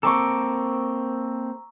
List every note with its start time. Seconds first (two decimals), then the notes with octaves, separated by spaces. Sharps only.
0.03 A#3 C4 A4 A#5 C#6 D6 E6